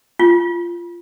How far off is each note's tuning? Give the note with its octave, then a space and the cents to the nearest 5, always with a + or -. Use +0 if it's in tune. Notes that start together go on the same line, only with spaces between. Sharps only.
F4 -15